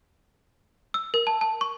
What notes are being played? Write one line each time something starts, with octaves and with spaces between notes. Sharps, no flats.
E6
A#4
A5
A5
C#6